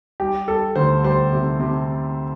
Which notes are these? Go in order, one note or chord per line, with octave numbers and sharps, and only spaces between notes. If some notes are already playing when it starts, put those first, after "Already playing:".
G3 G4
G3 A4
D2 C5
G3 C5
C3
C3